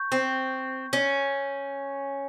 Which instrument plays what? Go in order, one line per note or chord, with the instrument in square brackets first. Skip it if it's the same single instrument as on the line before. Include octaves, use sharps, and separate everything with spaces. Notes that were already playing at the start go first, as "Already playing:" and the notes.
Already playing: [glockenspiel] C#6 G6
[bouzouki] C4
C#4